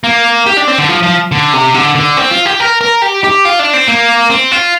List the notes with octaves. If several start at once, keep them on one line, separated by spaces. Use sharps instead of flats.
A#3
G4
D4
C4
D3
F3
F3
D3
C3
D3
D3
C4
F4
G4
A#4
A#4
G4
G4
F4
D4
C4
A#3
C4
F4